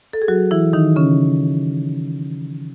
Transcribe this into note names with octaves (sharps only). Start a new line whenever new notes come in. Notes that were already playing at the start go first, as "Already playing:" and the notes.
A4
G#4
F#3 F#4
E3 E4
D#3 D#4
C#3 C#4